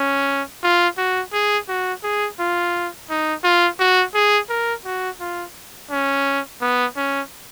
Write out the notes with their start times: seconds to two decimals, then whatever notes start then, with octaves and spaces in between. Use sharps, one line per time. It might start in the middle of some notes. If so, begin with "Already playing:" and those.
Already playing: C#4
0.63 F4
0.98 F#4
1.33 G#4
1.69 F#4
2.04 G#4
2.39 F4
3.10 D#4
3.44 F4
3.80 F#4
4.15 G#4
4.49 A#4
4.85 F#4
5.20 F4
5.91 C#4
6.61 B3
6.96 C#4